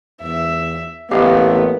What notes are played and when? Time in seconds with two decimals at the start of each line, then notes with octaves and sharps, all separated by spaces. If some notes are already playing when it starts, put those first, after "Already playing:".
0.21 E2 E5
1.11 A1 A#3 B3 G4 D#5 F5